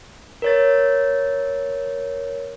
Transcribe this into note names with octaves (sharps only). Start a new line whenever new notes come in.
A#4 C#5 A6